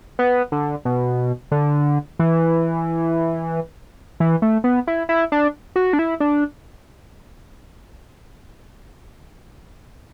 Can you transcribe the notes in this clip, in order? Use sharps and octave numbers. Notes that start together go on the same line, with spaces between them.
B3
D3
B2
D3
E3
E3
A3
B3
E4
E4
D4
F#4
D4
E4
D4